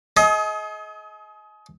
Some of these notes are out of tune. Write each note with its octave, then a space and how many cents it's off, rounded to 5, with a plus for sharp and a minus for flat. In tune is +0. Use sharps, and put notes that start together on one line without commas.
G#4 +40 D#5 +25